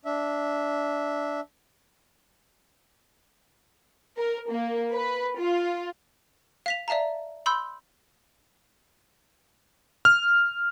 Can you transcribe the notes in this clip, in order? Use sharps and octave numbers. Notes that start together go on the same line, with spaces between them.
D4 E5
A#4
A#3
B4
F4
F5 B6 F7
D5 E5 F5 A5 A#5
B5 C6 E6 G6
F6